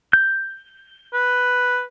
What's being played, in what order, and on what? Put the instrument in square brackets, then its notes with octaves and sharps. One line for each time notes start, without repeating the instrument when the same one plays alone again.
[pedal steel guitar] G6
[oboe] B4